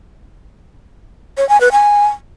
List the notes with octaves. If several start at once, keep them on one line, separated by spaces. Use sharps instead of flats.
C#5
G#5
B4
G#5